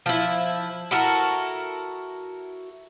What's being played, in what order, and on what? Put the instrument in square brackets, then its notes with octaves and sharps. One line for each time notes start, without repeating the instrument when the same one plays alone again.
[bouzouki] F3 E4
E4 F#4 A4 A#4